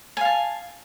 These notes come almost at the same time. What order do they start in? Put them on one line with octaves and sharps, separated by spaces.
G#5 F5 A5